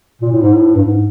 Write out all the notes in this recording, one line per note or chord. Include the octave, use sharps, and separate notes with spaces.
A#2
A2
G#2
A2
G2
G#2